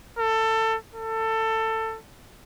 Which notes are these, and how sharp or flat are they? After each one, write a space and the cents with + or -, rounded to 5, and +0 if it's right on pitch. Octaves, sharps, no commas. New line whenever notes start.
A4 +20
A4 +20